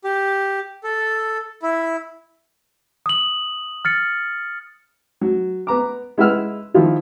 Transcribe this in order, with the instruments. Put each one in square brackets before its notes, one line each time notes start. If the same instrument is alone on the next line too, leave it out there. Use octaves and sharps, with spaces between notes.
[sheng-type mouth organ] G4
A4
E4
[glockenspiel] D#6 F#7
F6 A6 C#7
[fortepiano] F#3
B3 A#5 D6
G#3 E4 B4 F#5 E6 F6
D#3 F3 E4 F4